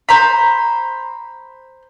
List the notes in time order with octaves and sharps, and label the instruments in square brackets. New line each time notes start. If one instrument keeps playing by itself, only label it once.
[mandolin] C5 A#5 B5